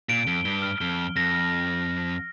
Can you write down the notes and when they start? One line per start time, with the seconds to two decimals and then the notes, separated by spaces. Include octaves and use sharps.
0.09 A#2 D7
0.27 F2 G7
0.44 G2 G7
0.62 F6
0.80 F2 G7
0.99 D7
1.16 F2 A#6
1.35 F6